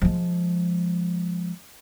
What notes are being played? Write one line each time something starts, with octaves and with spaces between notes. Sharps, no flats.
F3 G#3